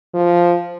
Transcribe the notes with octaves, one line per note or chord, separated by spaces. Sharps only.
F3